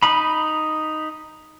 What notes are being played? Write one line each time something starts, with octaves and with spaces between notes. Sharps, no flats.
D#4 B5